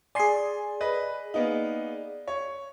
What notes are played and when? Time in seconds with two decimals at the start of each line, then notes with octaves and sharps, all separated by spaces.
0.15 G#4 D5 G#5 C6 C7
0.81 B4 D#5
1.34 A#3 B3 D#4
2.28 C#5